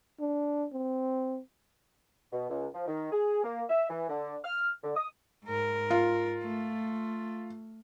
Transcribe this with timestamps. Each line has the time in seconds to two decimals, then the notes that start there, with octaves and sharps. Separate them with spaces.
0.20 D4
0.73 C4
2.33 B2
2.50 C#2
2.74 F3
2.88 D#3
3.12 G#4
3.44 A#3
3.70 E5
3.90 E3
4.09 D3
4.44 F6
4.84 D3
4.96 D#6
5.45 G#2 A#4
5.90 F4
6.42 A3